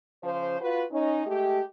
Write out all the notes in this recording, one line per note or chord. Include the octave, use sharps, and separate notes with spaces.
C#3 F3 C5
F4 F#4 B4
C#4 D#4
G#3 A3 G4